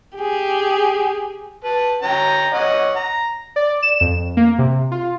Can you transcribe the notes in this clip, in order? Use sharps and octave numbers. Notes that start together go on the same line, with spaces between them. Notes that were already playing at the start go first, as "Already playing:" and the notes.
G4 G#4
B4 A5
C#4 G5 A#5
C#5 D#5 F#5
A#5
D5
E7
F2
A#3
C3
F4